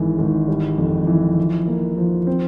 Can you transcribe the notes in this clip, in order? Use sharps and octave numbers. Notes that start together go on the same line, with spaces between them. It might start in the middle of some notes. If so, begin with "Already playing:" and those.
Already playing: G#1 E3 G#3
G#1
G3
F2
E3
F3
A#3
F3
C4